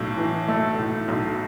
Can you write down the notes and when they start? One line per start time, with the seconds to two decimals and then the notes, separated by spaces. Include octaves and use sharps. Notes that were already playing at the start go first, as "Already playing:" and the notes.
Already playing: B1 A2
0.17 E3
0.48 A3
0.78 A2
1.08 B1